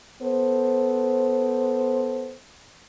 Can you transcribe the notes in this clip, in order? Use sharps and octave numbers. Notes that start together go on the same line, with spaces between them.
B3 A4 C5